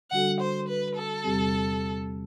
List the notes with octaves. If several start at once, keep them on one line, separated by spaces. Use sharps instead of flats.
D3 G3 D4 F#4 A4 F#5
C5
B4
A4
E2 C3 G3 C4 G4